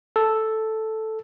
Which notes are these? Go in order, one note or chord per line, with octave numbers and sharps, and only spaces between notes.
A4